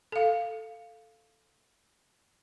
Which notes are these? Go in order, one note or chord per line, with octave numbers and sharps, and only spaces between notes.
A4 F5